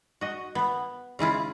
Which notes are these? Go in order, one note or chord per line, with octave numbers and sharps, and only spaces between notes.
F#4 D#5
B3
C#3 G#3 E4 F4